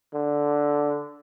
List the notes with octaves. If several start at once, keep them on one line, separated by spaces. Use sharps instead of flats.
D3